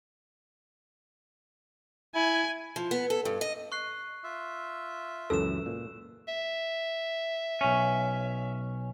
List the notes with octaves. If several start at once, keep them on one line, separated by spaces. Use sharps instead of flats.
E4 G#5
F3
B3
A4
G2
D#5
C#6 F#6 C7
F4 E5
C#2 F#2 E3 A4 E6 E7
A#2
E5
B1 C#4